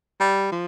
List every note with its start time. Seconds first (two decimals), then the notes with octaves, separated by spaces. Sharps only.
0.20 G3
0.52 F3